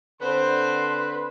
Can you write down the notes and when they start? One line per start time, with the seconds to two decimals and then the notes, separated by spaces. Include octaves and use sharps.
0.21 D3 C4 B4 C5 C6